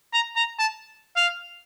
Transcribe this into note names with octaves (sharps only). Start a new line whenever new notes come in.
A#5
A#5
A5
F5